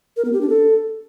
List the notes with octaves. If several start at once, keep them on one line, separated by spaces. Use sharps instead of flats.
A#4
B3
G4
D4
A4